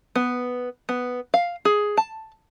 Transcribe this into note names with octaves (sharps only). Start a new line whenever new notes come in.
B3
B3
F5
G#4
A5